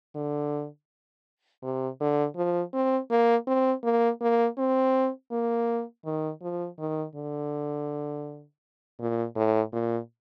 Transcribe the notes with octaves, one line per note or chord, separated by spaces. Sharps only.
D3
C3
D3
F3
C4
A#3
C4
A#3
A#3
C4
A#3
D#3
F3
D#3
D3
A#2
A2
A#2